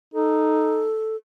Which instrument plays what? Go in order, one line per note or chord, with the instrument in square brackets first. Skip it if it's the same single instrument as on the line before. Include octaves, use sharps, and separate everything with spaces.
[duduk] D#4 [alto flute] A4